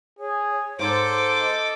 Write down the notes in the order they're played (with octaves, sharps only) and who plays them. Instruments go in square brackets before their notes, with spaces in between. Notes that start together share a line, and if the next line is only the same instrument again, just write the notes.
[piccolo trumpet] G#4 [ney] C#5
[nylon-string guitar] G#2 [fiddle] A4 D6 [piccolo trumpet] C5
[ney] D#5